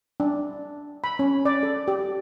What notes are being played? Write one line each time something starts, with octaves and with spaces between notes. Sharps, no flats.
D4
B5
C#4
D5
A4
G4